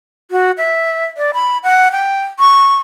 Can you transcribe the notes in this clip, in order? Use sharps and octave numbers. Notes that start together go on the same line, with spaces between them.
F#4
E5
D5
B5
F#5
G5
C#6